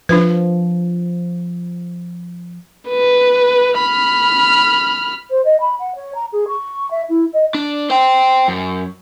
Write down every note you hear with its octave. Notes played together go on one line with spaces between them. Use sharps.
F3 D4 F4 B4
B4
B5 F6
C5
D#5
B5
F#5
C#5
A#5
G#4
C#6
E5
E4
D#5
D4
C5 G5
F#2